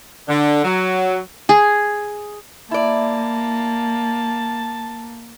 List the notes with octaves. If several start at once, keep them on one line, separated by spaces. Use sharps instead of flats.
D3
F#3
G#4
A#3 E4 D5 A5